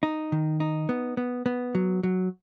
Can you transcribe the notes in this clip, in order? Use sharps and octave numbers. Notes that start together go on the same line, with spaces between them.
D#4
D#3
D#4
B3
B3
B3
F#3
F#3